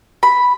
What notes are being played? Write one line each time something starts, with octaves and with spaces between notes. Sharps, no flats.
B5